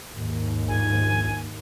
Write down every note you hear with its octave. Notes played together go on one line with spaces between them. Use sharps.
D#2 G#2
A#1 G#5